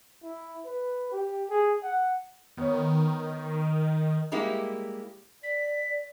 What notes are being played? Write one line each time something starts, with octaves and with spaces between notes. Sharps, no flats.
E4
B4
G4
G#4
F#5
D#3 B3 C#5
G3 G#3 A#3 E4 G4
D5 B6